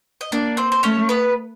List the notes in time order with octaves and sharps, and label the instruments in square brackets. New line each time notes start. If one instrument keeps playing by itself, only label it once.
[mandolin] D#5
[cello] A#3 [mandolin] D4 D5
[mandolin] C4 C5
C5
[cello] A3 [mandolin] C#4 C#5
[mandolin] B3 B4